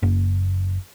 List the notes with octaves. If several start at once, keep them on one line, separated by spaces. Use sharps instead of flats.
F#1